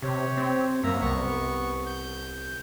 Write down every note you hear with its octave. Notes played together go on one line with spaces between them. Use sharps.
C3 G4 C#5
C4
F#2 A#3 E5 A#5
C2 B3 C#6
G6